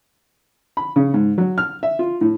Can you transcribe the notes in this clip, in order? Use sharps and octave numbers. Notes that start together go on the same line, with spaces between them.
B5
C#3
G#2
F#3
F6
E5
F4
A2